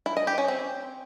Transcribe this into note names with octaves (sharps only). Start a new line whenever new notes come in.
E4
D#5
G4
C#4
C4